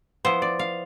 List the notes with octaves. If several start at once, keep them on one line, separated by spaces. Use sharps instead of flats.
F3 B3 E4 C5
D5
F5